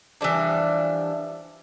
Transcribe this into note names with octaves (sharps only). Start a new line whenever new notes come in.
E3 F3 G3 D4